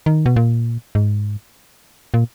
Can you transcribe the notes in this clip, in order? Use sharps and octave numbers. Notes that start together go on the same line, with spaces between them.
D#3
B2
A#2
G#2
A#2